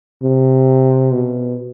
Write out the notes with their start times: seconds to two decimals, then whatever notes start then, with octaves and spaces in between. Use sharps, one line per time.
0.23 C3
1.12 B2